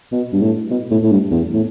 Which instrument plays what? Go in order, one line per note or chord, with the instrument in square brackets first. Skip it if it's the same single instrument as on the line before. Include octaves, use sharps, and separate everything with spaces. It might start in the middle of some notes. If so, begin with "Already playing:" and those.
[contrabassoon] B2
G2
A2
B2
A2
A2
G2
E2
A2